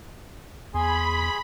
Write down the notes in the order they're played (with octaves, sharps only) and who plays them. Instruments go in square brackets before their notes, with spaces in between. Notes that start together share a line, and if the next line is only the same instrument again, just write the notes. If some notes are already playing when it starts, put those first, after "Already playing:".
[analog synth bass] E2 [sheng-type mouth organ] G#4 G#5 C6 [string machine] B5